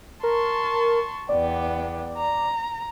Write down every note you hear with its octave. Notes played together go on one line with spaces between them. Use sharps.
A#4 A5 C6 C#6
E2 B3 D5 G5
A#5